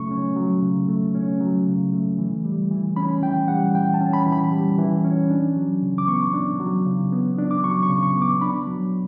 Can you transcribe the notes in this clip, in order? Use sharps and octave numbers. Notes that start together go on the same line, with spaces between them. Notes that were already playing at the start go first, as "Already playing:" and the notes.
Already playing: C#3 F#3 A3 C#4 C#6
C#4
F#3
C#3
A3
C#4
F#3
C#3
A3
E3
G3
E3
C#4 B5
E3 G5
G3 F#5
E3 G5
A5
C#4
B5
E3
B5
G3
E3
C#4
D4
F#3
C#3
D6
B3 C#6
D4
F#3
C#3
B3
D4
D6
F#3 C#6
C#6
C#3
C#6
B3
D6
D4 B5
F#3